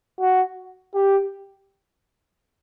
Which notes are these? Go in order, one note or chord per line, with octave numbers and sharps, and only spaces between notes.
F#4
G4